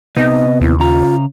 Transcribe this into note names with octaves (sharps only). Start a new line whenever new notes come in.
C3 B3 D#4 D#5
D#2 E4
C#3 F4 A#5